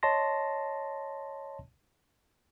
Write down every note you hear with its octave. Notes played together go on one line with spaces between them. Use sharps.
C#5 D#5 A5 C6 A#6